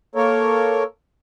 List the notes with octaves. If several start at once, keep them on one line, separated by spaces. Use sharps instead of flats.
A#3 A4 A#4 C#5